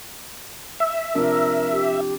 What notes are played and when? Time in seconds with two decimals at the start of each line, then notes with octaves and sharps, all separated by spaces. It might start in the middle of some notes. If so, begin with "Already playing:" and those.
0.80 E5
1.15 C3 F3 D4 A#4
1.72 G4